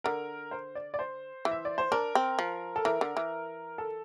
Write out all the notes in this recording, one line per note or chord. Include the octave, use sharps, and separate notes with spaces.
D3 A#4
C5
D5
D5
C5
E3
E5
D5
C5
D4 A#4
C4
F3
A4
E3 A#4
D3
E3
A4